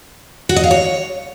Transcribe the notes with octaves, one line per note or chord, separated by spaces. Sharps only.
F#4
D#5
F5
C#5